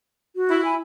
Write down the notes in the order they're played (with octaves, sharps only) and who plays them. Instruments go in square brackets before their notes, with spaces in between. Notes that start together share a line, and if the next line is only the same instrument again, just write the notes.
[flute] F#4
[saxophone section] E4
[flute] G#5